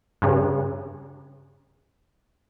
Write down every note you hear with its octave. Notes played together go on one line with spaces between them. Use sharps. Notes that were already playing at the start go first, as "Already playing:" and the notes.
G2 C#3